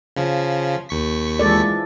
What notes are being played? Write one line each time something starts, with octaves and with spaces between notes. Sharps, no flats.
C#3 F3
D#2 C#6 B6
E3 F3 G#3 A4 D5